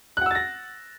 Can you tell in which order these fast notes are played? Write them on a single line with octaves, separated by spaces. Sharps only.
F#6 F#5 E6 A6 A#6